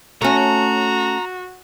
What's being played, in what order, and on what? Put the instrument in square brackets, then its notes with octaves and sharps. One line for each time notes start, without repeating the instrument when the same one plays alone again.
[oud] A3 C#4 [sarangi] F#4 [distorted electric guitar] A#5